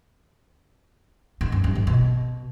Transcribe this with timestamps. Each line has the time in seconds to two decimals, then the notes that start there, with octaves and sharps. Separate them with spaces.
1.41 G#2
1.52 F#2
1.64 G2
1.75 A2
1.87 B2